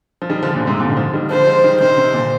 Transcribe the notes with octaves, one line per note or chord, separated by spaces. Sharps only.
F3
D#3 G3
D3 F3
A#2 D3
G#2 C3
A#2 D3
D#3
D3 F3
D#3 G3
D3 F3 C5
F3 G#3
D#3 G3
C3 D#3 C5
C3 D#3
A#2 D3